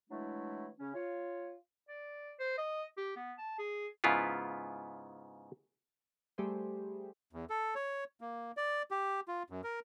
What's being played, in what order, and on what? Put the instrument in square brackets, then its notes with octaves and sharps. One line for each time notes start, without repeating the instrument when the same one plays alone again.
[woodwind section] E3 F#3 G#3 A3 D4 E4
C#3 C#4
F4 C#5
[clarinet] D5
C5
D#5
G4
B3
A5
G#4
[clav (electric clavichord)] G#2 C#3 B3 E4 F4
[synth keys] G3 A3 G4 G#4 C5
[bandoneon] E2
A4
C#5
A#3
D5
G4
F4
F#2
A#4